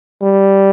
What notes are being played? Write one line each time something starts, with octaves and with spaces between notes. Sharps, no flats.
G3